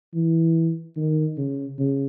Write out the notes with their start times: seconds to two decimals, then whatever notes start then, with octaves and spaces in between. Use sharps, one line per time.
0.14 E3
0.96 D#3
1.37 C#3
1.79 C#3